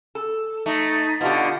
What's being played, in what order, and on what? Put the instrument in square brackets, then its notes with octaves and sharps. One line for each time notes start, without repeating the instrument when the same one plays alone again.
[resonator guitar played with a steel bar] A4
[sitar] A3 [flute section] D#4
[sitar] B2 D3 [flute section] F4 G4 F#5